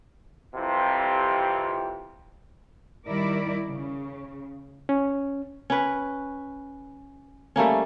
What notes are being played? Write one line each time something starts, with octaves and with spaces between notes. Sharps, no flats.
C2 F2 C3 E3 F4 G4
D#3 G3 E4 A#4 D5
C#3
C#4
C#4 B4
G3 A3 A#3 C#4